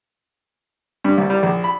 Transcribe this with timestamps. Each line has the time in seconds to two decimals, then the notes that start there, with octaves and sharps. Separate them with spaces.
1.05 G2
1.18 C2
1.30 G3
1.43 A#1
1.64 B5